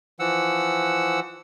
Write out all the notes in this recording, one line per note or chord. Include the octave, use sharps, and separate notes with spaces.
E3 F3 F#5 E6